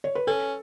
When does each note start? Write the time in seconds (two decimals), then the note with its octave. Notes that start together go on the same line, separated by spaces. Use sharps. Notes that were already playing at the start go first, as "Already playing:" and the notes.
0.04 C#5
0.15 B4
0.27 C#4 A4